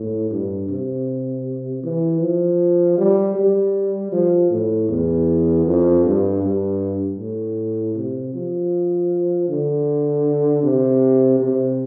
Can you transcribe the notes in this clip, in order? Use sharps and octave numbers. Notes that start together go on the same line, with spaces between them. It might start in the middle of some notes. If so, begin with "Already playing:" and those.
Already playing: A2
G2
C3
E3
F3
G3
G3
F3
A2
E2
F2
G2
G2
A2
C3
F3
D3
C3
C3